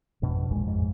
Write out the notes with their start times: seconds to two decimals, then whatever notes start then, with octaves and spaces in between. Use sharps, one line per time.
0.22 G#1 F2 B2 D4
0.51 A#1 D#2 A#2 G#3
0.63 F2 G#2